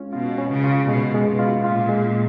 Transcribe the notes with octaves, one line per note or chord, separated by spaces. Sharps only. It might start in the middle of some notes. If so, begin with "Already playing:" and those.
Already playing: G#3 C#4 F4
B2 F4
C#4
C#3
F4
B2 G#3
G#3
B2
F4
A#2 F4
G#3